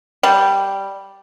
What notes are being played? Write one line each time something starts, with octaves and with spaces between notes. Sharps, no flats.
G3